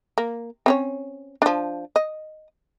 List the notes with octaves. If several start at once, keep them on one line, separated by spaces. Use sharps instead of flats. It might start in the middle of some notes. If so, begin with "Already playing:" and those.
A#3
C4 C#4 C#5
F3 D4
D#5